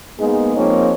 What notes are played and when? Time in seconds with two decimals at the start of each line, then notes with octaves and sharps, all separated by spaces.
0.19 G#3 A#3 B3 D#4 G#4
0.56 F3 G#3 A#3 C4 D#4 C#5